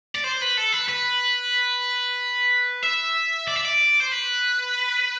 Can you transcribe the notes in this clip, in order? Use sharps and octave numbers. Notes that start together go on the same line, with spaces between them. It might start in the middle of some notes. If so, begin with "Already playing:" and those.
D5
C5
B4
A4
B4
B4
E5
D5
E5
D5
C5
B4